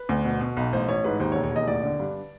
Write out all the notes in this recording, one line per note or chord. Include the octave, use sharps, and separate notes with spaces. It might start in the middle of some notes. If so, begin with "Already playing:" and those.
Already playing: B4
D2
B2
B2
B1
A1 C5
A1 C#5
G#2 B4
D#2 C5
C#5
E1
C#5
D#2 D#5
A1 D5
D3
G2